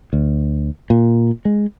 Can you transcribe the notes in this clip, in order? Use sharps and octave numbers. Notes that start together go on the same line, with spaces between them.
D2
A#2
G#3